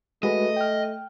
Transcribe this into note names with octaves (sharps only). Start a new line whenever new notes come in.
G#3 A3 F#4 B4 D#5
G5 F6